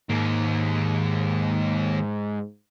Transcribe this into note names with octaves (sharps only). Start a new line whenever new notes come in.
D#2 G#2 A#3